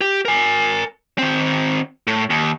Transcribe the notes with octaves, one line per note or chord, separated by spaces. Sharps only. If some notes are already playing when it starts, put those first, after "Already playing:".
G4
A#4 G#5
D#3 C4
A2
D#2